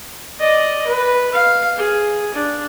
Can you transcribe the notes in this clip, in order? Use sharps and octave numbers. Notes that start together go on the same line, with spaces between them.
D5 D#5
B4
F5
G#4
D4